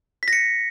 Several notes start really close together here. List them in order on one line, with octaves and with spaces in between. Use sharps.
B6 A#6 C#7